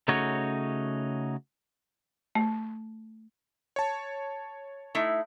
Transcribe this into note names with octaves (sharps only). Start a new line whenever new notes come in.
C#3 A3 C#4 D#4 F#4 C#5
A3
C#5 A5
A3 D#4 E4